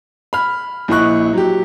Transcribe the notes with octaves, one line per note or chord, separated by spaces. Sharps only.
B5 F6
A#1 E4 D#5 C#6 F#6
F#3 G4